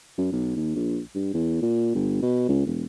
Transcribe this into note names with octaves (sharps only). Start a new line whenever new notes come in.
F#2
B1
D#2
A#1
G2
E2
A#2
G1
B2
C#2
E1